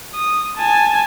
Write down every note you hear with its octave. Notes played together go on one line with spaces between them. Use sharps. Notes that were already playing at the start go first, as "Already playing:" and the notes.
D#6
G#5 A5